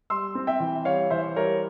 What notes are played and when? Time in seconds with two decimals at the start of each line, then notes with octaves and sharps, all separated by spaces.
0.10 G3 C6 E6
0.35 C4
0.47 E5 G5
0.60 E3
0.85 G3 C#5 F5
1.10 E3 C5 E5
1.36 G3 A#4 C#5